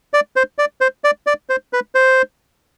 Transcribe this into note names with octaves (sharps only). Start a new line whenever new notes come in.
D5
C5
D5
C5
D5
D5
C5
B4
C5